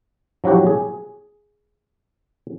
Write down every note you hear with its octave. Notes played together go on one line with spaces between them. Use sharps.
F3 F#3 E4 F#4 G4
G#4